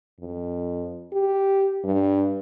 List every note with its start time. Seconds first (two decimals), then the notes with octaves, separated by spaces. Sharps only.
0.20 F2
1.13 G4
1.84 G2